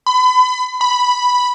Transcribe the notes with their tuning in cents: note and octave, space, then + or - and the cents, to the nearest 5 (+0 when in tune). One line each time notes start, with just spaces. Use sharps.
B5 +35
B5 +0